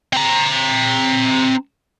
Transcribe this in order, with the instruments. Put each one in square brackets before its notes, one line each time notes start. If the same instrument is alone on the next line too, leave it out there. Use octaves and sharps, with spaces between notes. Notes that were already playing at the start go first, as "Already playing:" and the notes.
[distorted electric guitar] C4 A#5